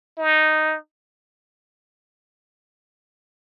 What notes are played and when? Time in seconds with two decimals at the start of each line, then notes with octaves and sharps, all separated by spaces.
0.18 D#4